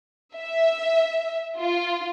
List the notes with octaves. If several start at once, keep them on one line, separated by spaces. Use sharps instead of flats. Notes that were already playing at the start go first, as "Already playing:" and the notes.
E5
F4